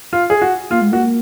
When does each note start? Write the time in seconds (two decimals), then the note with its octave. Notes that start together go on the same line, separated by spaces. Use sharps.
0.13 F4
0.30 G#4
0.42 F#4
0.70 A#3 F4
0.81 G#3
0.91 A#3 F#4